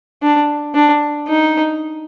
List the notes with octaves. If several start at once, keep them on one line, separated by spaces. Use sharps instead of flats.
D4
D4
D#4